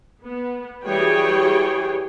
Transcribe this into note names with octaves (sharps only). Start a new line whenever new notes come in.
B3
E3 F#3 G3 G#4 C#5 G5